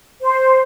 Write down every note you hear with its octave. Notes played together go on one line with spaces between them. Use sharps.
C5